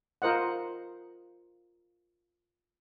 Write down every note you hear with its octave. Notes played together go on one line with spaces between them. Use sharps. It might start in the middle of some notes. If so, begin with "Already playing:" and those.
F4 A#4 C5 D#5 F#5